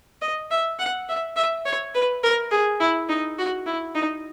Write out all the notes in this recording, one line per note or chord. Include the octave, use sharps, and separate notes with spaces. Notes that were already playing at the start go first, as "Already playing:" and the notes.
D#5
E5
F#5
E5
E5
C#5
B4
A#4
G#4
E4
D#4
F#4
E4
D#4